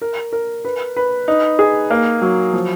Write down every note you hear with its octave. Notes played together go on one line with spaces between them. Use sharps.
A#4
A#4
B4
B4
D#4
G#4
A#3
F#3
F3